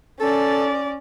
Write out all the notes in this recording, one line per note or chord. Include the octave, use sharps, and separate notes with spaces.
C#4 A4 D5